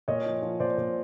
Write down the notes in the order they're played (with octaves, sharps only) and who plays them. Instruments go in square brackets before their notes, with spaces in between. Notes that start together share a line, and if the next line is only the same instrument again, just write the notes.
[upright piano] A#2 C#5 D#5
F3
F3
A#2 C5 D5
A#2